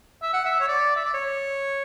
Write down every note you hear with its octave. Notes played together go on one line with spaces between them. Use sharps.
E5
F#5
E5
C#5
D5
E5
D5
C#5